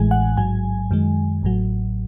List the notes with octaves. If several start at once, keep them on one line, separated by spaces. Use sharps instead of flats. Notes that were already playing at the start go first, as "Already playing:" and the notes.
Already playing: A1 A2 E3 G#3 G#5
F#5
A1 G#2 F#3 G#5
F#2 D#3 G#3
A1 A2 F#3